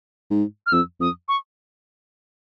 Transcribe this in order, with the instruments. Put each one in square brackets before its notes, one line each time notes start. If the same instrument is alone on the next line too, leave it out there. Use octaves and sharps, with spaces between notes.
[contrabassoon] G#2
[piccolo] F6
[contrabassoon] F2 [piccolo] E6
[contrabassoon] F2 [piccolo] D#6
[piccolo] C#6